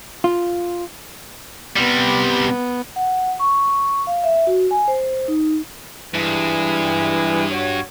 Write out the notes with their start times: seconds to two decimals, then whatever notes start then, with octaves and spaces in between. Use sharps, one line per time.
0.24 F4
1.76 C3 G3 B3
2.96 F#5
3.39 C#6
4.07 F5
4.24 E5
4.47 F#4
4.71 G#5
4.88 C5
5.28 D#4
6.14 G2 E3 G3 G#3
7.51 F#4 C#5